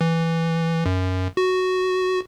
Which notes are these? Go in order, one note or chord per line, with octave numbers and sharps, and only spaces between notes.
E3
F#2
F#4